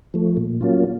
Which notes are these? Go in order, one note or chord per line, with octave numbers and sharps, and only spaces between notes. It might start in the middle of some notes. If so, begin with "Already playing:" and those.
F3 A3
A#2
F#3 A#3 C#4 F4